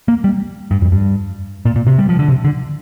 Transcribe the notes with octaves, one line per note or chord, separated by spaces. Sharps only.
A#3
G3
G2
F2
G2
A#2
A#2
C3
G3
F3
D3
C3
D3